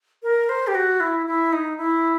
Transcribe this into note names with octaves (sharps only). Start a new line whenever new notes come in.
A#4
C5
G4
F#4
E4
E4
D#4
E4